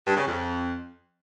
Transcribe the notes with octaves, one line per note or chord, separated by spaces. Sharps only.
G2
C#3
F2